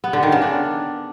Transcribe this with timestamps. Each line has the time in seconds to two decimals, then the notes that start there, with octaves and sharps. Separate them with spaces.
0.04 B3
0.13 D3
0.23 D#3
0.32 C#3
0.42 D4